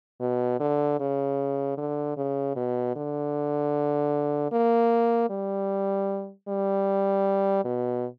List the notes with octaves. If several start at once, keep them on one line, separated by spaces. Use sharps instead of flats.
B2
D3
C#3
D3
C#3
B2
D3
A#3
G3
G3
B2